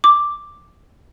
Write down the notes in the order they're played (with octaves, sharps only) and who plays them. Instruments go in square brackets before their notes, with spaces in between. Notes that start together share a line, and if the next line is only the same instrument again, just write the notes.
[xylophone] D6